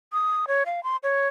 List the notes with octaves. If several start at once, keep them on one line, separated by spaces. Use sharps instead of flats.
D#6
C#5
F5
C6
C#5